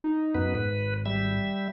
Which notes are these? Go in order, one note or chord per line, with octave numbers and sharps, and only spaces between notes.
D#4
F#2 B3 B4
G#1 B4
G3 E5